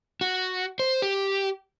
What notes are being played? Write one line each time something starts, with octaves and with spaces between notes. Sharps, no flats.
F#4
C5
G4